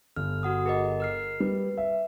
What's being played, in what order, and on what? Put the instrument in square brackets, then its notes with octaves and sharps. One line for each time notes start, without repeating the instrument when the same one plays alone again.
[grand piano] G1 [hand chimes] F6
[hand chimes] F#4 F#5 D#6
G#4 A#4 D#5
A#4 F6 C7
[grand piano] G3 [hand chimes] B4
[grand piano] E5